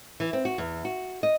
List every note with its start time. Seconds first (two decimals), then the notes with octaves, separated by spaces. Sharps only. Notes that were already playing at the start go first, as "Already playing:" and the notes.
0.20 E3
0.33 C4
0.45 F#4
0.58 E2
0.85 F#4
1.23 D#5